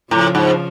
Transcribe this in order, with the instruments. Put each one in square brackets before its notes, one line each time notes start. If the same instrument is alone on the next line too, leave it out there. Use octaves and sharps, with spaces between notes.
[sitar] A2 [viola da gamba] C#3 F3
[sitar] G#2